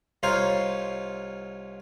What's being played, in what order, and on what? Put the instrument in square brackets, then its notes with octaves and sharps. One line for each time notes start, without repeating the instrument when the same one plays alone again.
[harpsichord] C2 D#4 F4 C5 C#5 F5